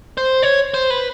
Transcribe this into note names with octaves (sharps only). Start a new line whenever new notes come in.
C5
C#5
C5
B4